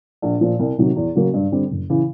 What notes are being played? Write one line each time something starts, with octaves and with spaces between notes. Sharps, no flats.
A#1
A#2 F3
C2
C3 D#3 F#3
E2
C#3 F#3 A#3 C#4
G2
D3 G3 C4
F#1
C#3 E3